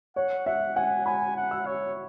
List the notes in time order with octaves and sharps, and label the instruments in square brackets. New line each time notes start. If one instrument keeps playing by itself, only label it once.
[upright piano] C#5 [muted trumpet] F#5
[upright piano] E5 [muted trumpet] F#5
[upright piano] F#5 [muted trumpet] G#5
[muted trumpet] G#5 [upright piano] B5
[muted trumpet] F#5
[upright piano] E6
[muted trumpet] C#5